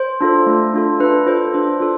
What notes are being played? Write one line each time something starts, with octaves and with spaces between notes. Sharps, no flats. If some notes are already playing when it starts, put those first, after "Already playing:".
Already playing: C5
D4 F4 A4
A3
D4 F4 A4
D4 B4
F4 A4 C5
D4 C5
F4 A4